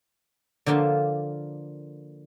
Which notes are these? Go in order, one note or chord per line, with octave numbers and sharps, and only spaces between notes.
D3 F3 A#3 F4 A5